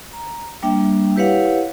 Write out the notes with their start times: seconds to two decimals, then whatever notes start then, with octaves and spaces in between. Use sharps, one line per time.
0.13 A#5
0.63 G3 A#3 D4 E5 G5
1.16 E4 G4 B4 C#5 F5 F#5